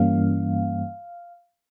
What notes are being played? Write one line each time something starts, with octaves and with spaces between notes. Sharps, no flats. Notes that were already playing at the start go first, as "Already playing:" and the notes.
Already playing: G2 E3 G3 A#3 C#4 F5